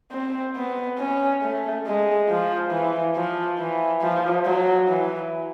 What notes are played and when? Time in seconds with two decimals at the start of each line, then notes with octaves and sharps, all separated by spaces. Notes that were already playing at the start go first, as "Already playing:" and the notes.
0.12 C4
0.56 B3
0.99 C#4
1.42 A3
1.86 G#3
2.29 F3
2.71 E3
3.16 F3
3.58 E3
4.02 F3
4.45 F#3
4.88 E3